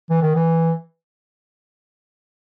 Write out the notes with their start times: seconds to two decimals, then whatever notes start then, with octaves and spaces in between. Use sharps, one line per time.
0.10 E3
0.22 D#3
0.35 E3